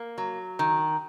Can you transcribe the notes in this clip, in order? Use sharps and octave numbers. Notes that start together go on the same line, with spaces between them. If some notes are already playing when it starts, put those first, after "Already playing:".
Already playing: A#3
F#3
D#3